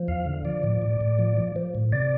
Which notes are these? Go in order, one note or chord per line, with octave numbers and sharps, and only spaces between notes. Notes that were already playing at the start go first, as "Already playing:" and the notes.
Already playing: F3
E2 F5
D3
F3 D5
A2
A2
A2
F3
F3
F3
A2
C3 D5